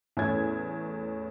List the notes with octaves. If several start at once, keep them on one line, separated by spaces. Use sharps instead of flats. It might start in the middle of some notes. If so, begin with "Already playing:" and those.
E2 A2 A3 C#4 G#6